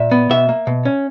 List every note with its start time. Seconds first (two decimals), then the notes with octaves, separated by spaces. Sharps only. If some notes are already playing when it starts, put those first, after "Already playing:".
Already playing: A#2 E5
0.11 B3
0.30 B2 E5
0.49 A#3
0.67 B2
0.85 C#4